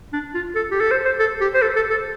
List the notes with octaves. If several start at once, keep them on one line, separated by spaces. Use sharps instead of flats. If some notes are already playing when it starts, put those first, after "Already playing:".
D4
F4
A4
G4
A4
C5
C5
A4
G4
C5
A4
A4
A4